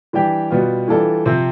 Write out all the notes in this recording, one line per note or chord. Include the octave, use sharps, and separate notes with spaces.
E3 G3 D4 G4
B2 G3 B3 F4
E3 G3 D4 F4 A4
C3 F3 C4